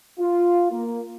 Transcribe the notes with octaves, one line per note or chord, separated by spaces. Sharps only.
F4
A#3